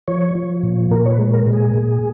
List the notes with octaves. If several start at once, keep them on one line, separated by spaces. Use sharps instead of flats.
F3 C#5
F3
A#2
A#2 A#4
C#5
B4
G#3
A#4
A#2
G#4
A#2